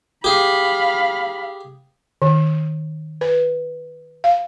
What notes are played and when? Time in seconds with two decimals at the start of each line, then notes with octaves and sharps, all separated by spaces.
0.24 G4 G#4 F5 B5
2.22 D#3
3.21 B4
4.24 F5